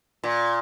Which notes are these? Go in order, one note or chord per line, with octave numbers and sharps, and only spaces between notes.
A#2